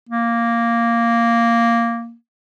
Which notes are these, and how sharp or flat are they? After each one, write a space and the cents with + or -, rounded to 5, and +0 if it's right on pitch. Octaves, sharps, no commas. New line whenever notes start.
A#3 -5